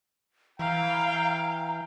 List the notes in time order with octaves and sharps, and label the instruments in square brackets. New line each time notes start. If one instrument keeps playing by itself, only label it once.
[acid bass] E3 [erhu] F5 [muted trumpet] G5 [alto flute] A#5